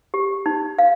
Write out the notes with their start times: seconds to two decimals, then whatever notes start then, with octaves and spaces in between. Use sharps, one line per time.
0.14 G4
0.46 D#4
0.79 F5